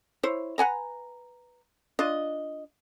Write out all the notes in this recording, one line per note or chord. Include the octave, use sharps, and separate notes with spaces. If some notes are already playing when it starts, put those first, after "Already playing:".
E4 C5 C#5
B4 F#5 G#5 A#5
D4 F4 D#5